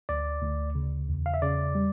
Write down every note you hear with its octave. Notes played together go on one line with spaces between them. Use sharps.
D2 D5
D2
C#3
E2
F5
E5
C#3 D5
G3